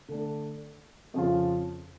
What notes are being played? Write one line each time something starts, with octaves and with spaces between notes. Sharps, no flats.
D3 A3 D4
F2 C#3 F3 C#4 F4